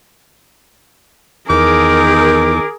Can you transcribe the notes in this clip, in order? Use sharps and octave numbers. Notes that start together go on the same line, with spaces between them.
E2 D#3 G#4 A#4 D6